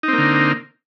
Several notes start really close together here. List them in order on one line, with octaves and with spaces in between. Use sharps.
D#4 C4 A#3 D3